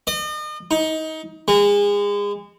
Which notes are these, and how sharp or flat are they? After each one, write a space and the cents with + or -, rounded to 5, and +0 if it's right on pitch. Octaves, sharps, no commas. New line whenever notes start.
D#5 -40
D#4 +25
G#3 -30